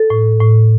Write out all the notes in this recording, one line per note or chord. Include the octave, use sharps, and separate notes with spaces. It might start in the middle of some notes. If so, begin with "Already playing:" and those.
Already playing: A4
A2
A2